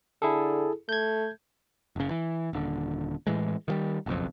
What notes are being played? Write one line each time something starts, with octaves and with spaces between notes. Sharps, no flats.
D3 E4 G#4 A4
A3 G6 G#6
F#1 C#3
E3
D#1 D3
A2 E3 G#3
D#3 F3 G3
F#1 B1 F2